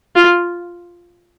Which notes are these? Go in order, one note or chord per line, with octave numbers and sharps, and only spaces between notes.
F4